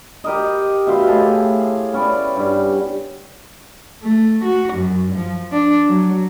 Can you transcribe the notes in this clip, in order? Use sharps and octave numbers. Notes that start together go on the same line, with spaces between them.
G4 A#4 D#5
B2 E5 F5 C6
A2 G#4 A5
B3 C#4 D5 G5
G2
A3
F#4
F#2
F3
D4
F#3